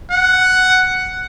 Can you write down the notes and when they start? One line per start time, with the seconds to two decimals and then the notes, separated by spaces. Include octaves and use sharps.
0.11 F#5